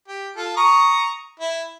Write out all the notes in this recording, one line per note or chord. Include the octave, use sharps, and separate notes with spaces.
G4
F4 A4
A#5 C#6 D#6
E4